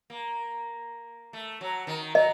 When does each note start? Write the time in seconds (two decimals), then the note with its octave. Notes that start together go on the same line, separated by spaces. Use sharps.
0.10 A#3
1.33 A3
1.61 F#3
1.87 D#3
2.15 F#3 D#5